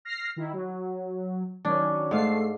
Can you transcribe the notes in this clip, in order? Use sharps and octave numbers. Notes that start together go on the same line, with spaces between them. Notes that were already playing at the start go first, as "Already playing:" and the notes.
F6 A#6 C7
D#3 E4
F#3
D#3 F#3 C#4 D4
G#2 A3 A4 F5 C7